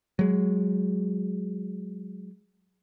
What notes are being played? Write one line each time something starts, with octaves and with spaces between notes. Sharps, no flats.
F#3 G#3